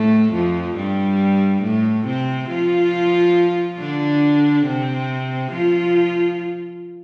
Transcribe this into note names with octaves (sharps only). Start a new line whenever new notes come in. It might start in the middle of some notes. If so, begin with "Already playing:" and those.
Already playing: A2 A3
F2 F3
G2 G3
A2 A3
C3 C4
F3 F4
D3 D4
C3 C4
F3 F4